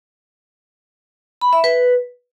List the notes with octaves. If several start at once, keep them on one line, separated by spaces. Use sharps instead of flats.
B5
E5
B4